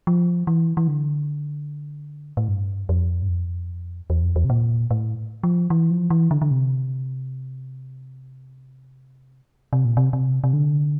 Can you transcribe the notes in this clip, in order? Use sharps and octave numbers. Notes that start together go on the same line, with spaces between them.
F3
E3
E3
D3
A2
G2
F2
G2
F2
E2
F2
E2
C3
A#2
A2
F3
E3
F3
E3
D3
D3
C3
C3
A#2
C3
C3
C3
D3